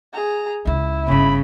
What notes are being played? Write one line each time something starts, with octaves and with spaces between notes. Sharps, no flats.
G#4 A#5
C#2 C#3 E4
G1 G2 C#3 B5